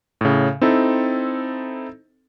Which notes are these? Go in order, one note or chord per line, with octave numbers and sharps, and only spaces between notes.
A2 C#3
C4 D#4 E4 A4